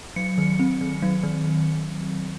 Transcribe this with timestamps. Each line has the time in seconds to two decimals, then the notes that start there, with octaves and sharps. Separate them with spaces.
0.16 F#3 C#7
0.38 D#3
0.59 C4
0.81 D#3
1.02 F#3
1.23 D#3